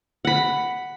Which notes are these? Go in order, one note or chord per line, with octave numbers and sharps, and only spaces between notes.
F#5 B5